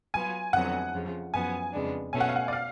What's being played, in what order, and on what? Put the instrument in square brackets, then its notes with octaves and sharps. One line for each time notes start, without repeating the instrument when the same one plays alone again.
[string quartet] F#3 B3 F4 [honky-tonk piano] G#5
[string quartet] F2 D3 F#3 B3 [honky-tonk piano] F#5
[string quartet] F2 C#3 F3
[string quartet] F#2 F3 B3 [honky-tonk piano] G#5
[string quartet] F2 C#3 G#3 B3 D4
[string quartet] B2 A3 C#4 [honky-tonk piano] G#5
[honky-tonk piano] F#5
F5
F#5
D5
F5